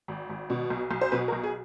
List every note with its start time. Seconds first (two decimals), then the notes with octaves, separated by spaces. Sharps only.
0.08 G#1
0.30 G#1
0.50 B2
0.70 B1
0.91 B1
1.01 C5
1.12 B2 B4
1.28 A#4
1.32 B1
1.43 G#4